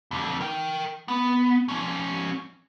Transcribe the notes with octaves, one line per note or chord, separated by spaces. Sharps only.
F2 D3
A#4 G5
B3
F3 C#4